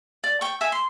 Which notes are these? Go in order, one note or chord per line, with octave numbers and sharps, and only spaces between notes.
D5
G5 C#6
E5 G#5
C6